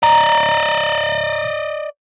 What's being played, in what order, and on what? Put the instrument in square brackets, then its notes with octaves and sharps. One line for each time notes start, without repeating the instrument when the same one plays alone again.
[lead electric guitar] D5 D#5 [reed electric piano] A#5